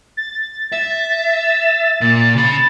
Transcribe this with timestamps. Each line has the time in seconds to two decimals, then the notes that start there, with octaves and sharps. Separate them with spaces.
0.17 A6
0.72 E5
2.01 A#2
2.36 C#3 B5